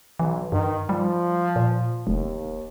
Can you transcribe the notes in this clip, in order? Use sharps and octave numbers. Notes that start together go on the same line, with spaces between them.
B1 E3
G2 D#3
F3 G3
A#2
F1 D#2